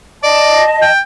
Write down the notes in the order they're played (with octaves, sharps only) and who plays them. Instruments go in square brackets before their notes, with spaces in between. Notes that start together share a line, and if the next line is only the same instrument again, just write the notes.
[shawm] D5 [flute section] D#5 A5
[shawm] G5